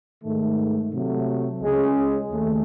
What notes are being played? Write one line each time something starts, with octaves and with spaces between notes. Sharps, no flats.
G#2 D#3 A3
C3 F#3 A3
C#2 C#3 G#3 C#4 G#4
D#2 D#3 A3